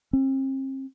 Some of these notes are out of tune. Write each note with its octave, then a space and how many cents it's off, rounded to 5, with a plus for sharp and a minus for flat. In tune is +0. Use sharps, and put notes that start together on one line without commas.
C4 +40